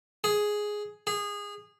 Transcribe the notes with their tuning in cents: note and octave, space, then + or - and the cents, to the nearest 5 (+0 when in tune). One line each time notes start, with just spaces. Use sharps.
G#4 +5
G#4 -20